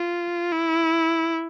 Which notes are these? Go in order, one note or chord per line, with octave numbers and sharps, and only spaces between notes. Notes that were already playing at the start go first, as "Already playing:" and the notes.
Already playing: F4
E4